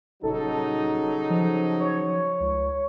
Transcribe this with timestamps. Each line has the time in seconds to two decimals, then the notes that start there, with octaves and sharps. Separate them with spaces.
0.23 D#1 C#3 F#3 D#4 A4
1.30 F3
1.80 C#5
2.40 C#2